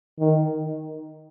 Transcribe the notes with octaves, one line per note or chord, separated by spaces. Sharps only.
D#3